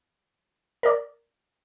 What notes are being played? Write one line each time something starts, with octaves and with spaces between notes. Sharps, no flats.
A#4 D5